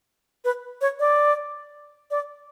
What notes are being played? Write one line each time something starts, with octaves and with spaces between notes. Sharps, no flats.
B4
C#5
D5
D5